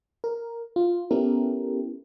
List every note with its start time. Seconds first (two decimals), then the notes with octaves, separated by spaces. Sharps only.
0.24 A#4
0.76 F4
1.11 B3 C#4 E4 G4 A4 A#4